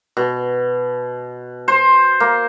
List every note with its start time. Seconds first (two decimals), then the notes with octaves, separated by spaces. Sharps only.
0.17 B2
1.68 C5
2.20 A#3